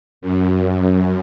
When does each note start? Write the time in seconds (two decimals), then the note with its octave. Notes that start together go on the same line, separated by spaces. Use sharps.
0.21 F#2